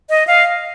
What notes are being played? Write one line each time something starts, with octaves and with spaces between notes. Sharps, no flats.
D#5
F5